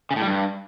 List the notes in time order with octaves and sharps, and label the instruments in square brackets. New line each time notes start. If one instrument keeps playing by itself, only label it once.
[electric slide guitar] C#3
A2
G3
G2